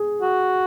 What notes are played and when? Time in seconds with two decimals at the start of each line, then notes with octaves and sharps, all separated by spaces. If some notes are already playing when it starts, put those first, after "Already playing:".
Already playing: G#4
0.21 F#4